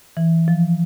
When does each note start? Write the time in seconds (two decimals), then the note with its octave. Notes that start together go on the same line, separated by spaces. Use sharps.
0.17 E3
0.48 F3